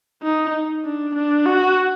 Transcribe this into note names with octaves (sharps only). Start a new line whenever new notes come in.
D#4
D4
D4
F#4